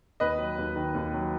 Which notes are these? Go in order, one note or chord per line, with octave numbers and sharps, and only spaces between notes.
D#2 B4 D#5
F#3
D#2
D#3
D#2
F#3